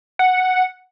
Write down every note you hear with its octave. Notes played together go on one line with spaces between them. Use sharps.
F#5